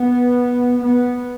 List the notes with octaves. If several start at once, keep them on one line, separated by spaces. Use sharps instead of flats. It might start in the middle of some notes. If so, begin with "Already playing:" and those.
Already playing: B3
B3